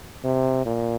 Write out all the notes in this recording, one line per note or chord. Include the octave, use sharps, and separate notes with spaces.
C3
A#2